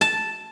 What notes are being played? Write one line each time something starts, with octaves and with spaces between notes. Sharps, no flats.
A5